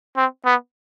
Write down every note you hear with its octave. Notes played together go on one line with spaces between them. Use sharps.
C4
B3